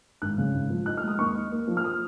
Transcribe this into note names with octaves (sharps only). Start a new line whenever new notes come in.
G#1 F#6
C#3
G#1
F3
D#4 F#6
F6
G#3 D#6
D#2 C#6
D#4
A#3
F3
F6
D#6